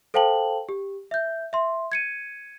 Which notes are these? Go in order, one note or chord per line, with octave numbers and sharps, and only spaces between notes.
A4 C5 F5 G5 A5 F#7
G4
E5 G6
E5 C6
G#6 C#7 D#7